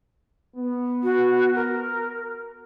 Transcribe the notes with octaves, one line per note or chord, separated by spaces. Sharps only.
B3
F#4
A#4